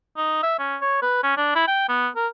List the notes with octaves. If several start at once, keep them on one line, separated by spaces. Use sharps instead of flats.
D#4
E5
C#4
C#5
B4
C#4
D4
E4
G5
B3
A#4